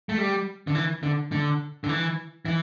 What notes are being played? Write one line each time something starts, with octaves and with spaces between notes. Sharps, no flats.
A3
G3
D3
E3
D3
D3
D3
E3
E3